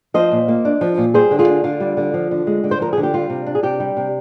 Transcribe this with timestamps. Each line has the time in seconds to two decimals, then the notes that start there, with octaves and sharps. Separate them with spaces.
0.14 F3 C5 D#5
0.32 A#2
0.48 A#3
0.65 D4
0.81 F3
0.98 A#2
1.14 G3 G#4 C5
1.31 D3
1.39 F4 G#4
1.48 D4
1.64 D3 F4
1.80 G3
1.97 D3
2.14 F3
2.31 D3
2.47 G#3
2.64 D3
2.71 C5
2.80 F3 A#4
2.93 D3 G#4
3.03 G4
3.14 G3 F4
3.30 C3
3.46 D4
3.55 G#4
3.63 C3 G4
3.80 G3
3.97 C3